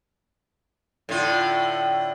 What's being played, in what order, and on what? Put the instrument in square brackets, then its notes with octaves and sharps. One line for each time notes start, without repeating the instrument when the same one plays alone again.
[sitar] A2 D3 F4